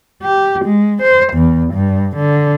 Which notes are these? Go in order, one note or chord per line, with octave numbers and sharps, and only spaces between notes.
G4
G#3
C5
E2
G2
D3